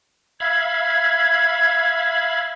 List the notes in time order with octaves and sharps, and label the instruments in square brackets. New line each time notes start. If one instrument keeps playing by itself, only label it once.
[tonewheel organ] E5 F5 B5 [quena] G#6